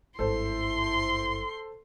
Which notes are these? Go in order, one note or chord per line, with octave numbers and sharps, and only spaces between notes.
G#1 G2 E4 A4 C5 C6